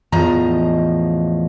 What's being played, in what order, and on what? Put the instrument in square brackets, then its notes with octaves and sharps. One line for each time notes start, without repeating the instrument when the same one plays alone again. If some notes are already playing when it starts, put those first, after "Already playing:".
[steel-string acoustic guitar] E2 A2 F3 D#5 A#5